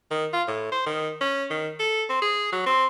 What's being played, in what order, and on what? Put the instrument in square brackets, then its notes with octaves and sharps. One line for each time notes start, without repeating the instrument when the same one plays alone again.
[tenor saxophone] D#3
F4
A2
C5
D#3
C#4
D#3
A4
C4
G#4
F#3
C4